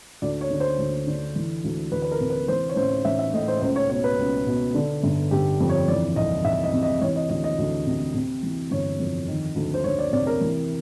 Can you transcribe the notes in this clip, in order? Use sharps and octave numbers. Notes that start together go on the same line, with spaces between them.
D2 D5
C#5
D3
C5
D2
D3
E3
D2
D2 B4
B4
A#4
C3
B4
E3 C5
C#5
A1 C5
A1 E5
E5
A2 D#5
C5
C#2 C5
C#5
B2 C#5
B4
C#2
B2
D3
G1
G1 G4
F2
C#5
E3 D5
C2 D#5
C2 E5
D#5
C3
D#5
E3 C#5
D#5
D2 D#5
D#5
D2
C3
C3
E3
G1 C#5
F2
D#3
D2
C5
D2 C#5
D5
C3 D5
A#4
E3